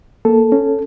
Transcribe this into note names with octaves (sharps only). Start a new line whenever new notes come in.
A#3 A4
C#4